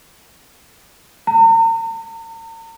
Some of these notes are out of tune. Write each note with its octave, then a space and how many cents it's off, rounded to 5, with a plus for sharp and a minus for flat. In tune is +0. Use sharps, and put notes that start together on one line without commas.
A#5 -40